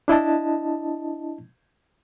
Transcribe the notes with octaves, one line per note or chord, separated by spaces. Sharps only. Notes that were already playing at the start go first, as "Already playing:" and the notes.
D4 E4 D#5 A5